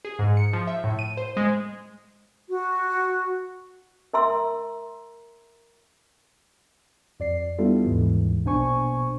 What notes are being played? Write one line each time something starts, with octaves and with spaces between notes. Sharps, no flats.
G#4
G#2
C#7
F3
E5
A2
D#7
C5
G#3
F#4
A#4 E5 A#5 C6 E6
F2 D5 C7
G3 B3 D4 E4 F4 A4
D#2 G#2 E3
A#1 B2 D4 C5 G#5 C#6